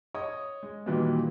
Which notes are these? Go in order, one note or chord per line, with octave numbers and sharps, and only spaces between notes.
C#5 D#5 D#6
G#3
A#2 D#3 E3 F#3 G3 A#3